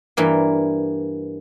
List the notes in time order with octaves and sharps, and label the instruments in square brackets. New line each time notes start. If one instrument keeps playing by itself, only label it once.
[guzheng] G2 E3 A#3